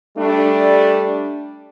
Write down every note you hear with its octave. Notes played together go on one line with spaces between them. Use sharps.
G3 A3 D4